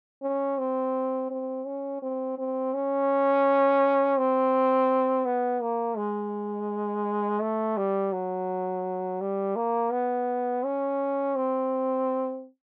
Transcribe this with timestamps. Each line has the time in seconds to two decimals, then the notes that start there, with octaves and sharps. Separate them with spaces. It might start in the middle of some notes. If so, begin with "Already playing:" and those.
0.22 C#4
0.58 C4
1.30 C4
1.66 C#4
2.02 C4
2.38 C4
2.74 C#4
4.17 C4
5.26 B3
5.62 A#3
5.97 G#3
7.41 A3
7.77 G3
8.13 F#3
9.21 G3
9.56 A#3
9.92 B3
10.64 C#4
11.36 C4